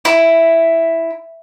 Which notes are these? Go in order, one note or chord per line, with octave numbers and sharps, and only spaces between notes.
E4